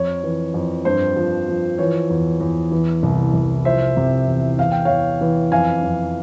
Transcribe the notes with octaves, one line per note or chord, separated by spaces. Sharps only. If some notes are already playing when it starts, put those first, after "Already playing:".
Already playing: F2 C#5
E3
F2
G2 C5
F3
F3
E3 C#5
E2
E2
E3
C2
C2
F3 C5 E5
C3
E2
E2 F5
G5
E2 C#5 F5
E3
F2 F5 G#5
F2